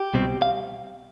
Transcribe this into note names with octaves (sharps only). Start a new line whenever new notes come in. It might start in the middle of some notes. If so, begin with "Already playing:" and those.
Already playing: G4
C2 B2 G3 C4
F5